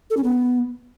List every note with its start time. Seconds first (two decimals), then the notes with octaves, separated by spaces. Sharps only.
0.10 A4
0.17 C#4
0.24 B3